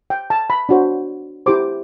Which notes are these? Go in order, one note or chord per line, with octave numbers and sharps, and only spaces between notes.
G5
A5
B5
D4 F#4 C5
E4 G4 C5 D6